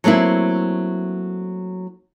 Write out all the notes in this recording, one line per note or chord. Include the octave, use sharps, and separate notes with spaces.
F#3 A3 A#3 C4 E4